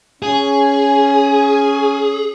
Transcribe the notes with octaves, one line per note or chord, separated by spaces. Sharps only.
C#4 G#4